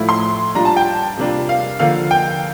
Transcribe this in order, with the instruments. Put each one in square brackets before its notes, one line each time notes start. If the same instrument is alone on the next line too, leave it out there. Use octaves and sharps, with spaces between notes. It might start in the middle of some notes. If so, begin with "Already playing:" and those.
Already playing: [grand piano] A2 F3 A3 E4
C6
A#2 G3 D4 F4 A#5
A5
G5
C3 G3 A#3 D4 F4
F5
D3 F3 A#3 F4 F5
G5